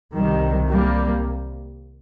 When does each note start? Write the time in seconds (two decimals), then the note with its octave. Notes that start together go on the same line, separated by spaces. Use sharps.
0.15 C2 C3 D#3 G3
0.71 G3 A#3